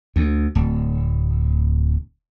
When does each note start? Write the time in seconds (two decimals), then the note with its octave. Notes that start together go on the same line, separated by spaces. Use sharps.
0.16 D2
0.55 D1